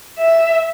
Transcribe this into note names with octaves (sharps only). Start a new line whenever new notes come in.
E5